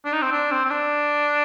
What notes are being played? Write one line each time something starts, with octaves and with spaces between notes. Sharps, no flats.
D4
D#4
C4
D4
C4
C4
D4